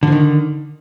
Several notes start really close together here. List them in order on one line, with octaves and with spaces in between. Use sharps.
D3 F3 D#3